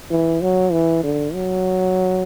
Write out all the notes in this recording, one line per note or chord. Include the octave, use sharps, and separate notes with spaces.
E3
F#3
E3
D3
F#3